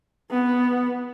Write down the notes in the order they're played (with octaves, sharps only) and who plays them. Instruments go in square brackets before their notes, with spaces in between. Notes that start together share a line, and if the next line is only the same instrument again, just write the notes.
[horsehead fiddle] B3